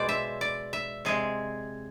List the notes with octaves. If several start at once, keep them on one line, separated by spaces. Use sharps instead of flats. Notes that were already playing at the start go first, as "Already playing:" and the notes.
Already playing: B2 G#3 C5 D5
E5
D5
E5
C3 G#3 G#4